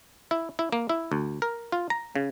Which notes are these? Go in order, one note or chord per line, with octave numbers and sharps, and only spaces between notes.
E4
E4
A#3
E4
D2
A#4
F4
A#5
C#3